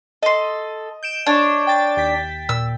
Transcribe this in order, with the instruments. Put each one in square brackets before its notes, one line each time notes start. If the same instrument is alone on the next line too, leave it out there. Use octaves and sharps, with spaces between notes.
[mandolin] A4 C6 [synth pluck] D#5
[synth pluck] G6 D7 E7
[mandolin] D4 C#5
[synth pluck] G5 A6
D#2 G5 B6
[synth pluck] A#2 [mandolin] E6